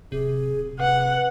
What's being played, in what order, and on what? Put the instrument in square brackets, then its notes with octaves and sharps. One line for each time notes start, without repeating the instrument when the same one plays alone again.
[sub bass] D1 [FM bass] C3 [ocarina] G#4
[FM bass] C3 [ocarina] B4 [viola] F#5